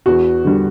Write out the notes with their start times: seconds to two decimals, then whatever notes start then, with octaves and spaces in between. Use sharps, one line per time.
0.06 E2 F#4
0.44 D3 G3